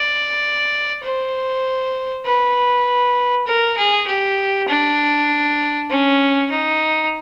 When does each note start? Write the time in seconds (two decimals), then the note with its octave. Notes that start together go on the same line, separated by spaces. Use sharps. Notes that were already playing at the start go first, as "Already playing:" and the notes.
Already playing: D5
1.04 C5
2.25 B4
3.47 A#4
3.77 G#4
4.07 G4
4.68 D4
5.90 C#4
6.51 D#4